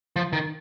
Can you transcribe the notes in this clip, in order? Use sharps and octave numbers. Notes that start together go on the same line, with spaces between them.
F3
D#3